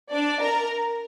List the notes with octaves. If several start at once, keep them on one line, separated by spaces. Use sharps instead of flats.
D4 D5
A#4 A#5